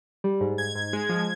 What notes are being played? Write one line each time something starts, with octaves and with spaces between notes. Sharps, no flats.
G3
G#2
G#2 G#6
G#2
G#3
F3